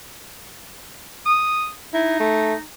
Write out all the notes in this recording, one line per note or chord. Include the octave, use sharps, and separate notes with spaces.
D#6
D#4 E4
A3